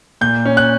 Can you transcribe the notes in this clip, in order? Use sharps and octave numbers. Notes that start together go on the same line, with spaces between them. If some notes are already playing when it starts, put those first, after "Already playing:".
A#2 G6
C#4
F#6